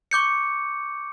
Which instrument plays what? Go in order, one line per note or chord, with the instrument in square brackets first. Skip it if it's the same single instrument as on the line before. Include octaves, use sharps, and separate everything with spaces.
[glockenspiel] C#6 D6 G6 C#7